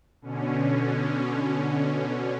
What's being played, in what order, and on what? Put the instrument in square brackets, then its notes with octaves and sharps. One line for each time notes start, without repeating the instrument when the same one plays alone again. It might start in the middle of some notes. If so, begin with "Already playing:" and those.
[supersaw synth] B2 D3 C#4